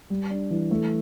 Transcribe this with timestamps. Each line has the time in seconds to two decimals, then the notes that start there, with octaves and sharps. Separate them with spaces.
0.10 G3
0.30 D4
0.51 E3
0.71 A3